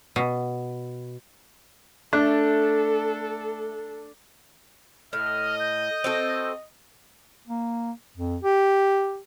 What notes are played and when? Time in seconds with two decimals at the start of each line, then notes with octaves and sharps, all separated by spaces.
0.16 B2
2.13 A3 D4 A4
5.13 A2 D#5 F6
5.60 G6
6.04 C4 F#4 A4
7.48 A#3
8.17 F2
8.43 G4